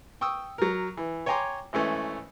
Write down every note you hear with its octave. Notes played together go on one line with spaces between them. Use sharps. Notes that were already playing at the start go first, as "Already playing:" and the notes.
G5 C#6 D#6 E6
F#3 A#4
E3
C#5 G5 G#5 A#5 C6 D6
G#1 E3 A3 C#4